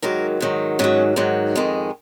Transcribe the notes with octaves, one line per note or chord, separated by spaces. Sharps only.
G#2 D#3 F#3 A#4
G#2 D#3 F#3
G#2 D#3 F#3 C#4
G#2 D#3 F#3
F2 D#3 G#3